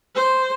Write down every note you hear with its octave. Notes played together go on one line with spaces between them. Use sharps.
C5